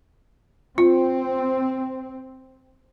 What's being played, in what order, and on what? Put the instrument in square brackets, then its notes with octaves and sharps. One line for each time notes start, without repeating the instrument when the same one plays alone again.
[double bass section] C4 [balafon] F4